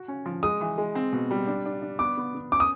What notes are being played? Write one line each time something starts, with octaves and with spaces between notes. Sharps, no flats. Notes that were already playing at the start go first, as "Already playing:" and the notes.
Already playing: F#4
C#4
F3
G#3 D#6
E3
G#3
C4
B2
G3
D4
D4
D4
B3 D6
B3
B3
C#4 D6
D#6